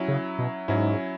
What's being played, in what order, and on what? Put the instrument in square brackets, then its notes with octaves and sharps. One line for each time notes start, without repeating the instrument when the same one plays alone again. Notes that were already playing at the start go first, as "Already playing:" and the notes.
Already playing: [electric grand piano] F#3 C#4 E4
[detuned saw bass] C#3
B2
[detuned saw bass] G#2 [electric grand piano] F#3 C#4 E4